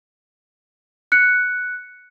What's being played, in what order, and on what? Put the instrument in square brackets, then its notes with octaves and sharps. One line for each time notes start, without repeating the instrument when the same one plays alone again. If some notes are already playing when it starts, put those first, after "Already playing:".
[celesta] F#6 C#7